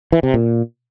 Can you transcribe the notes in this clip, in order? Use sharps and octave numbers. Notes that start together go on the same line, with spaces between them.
E3
C3
A#2